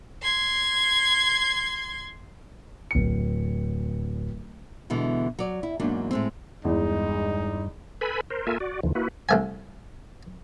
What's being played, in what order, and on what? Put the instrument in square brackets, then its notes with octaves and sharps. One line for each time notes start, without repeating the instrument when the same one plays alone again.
[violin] C6 G#6
[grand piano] D1 C#7
[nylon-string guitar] B2 D3 E3 G#3
F#3 D5
E4
E2 G#2 F#3 A#3 D4
A2 G#3 C4
[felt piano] E2 [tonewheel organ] G2 [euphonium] G#3 [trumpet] D#4
[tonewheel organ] A4 B4 G#5 B5
A#4 C5
A#3 F4 A4 A#4 E5 G#5
F#4 D5
D#2 D3 E3 F3
A#3 E4 F#4 B4
[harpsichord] C2 A3 G#5